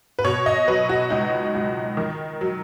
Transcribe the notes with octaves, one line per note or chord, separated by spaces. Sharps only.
B4
B2 C#5
D#5
F#3 B4
F#4
C#2 D#4
C#2
D#3
F#3